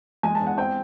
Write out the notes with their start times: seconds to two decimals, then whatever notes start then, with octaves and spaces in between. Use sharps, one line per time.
0.23 G#3 G#5
0.35 A5
0.40 E2
0.47 F#5
0.58 C4 G5